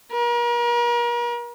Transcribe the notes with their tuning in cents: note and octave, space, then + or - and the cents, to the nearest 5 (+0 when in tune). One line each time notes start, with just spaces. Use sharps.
A#4 +40